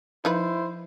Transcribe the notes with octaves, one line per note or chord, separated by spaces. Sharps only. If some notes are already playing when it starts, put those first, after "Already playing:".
F3 D#4 E4 B4 C5